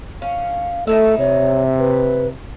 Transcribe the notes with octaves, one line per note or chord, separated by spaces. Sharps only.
C#4 F5
A3 D#4 E4 A4 E5
C3 C#5
B4